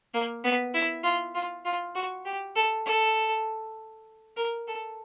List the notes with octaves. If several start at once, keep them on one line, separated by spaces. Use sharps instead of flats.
A#3
B3
E4
F4
F4
F4
F#4
G4
A4
A4
A#4
A4